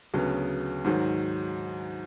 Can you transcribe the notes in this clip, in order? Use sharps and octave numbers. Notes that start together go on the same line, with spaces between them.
D2 C#3 F#3 B3
G#2 D#3 F#3